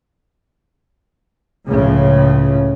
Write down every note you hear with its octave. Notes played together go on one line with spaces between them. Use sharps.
C#2 A2 C#3 F3